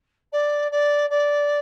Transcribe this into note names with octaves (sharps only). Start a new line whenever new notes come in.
D5
D5
D5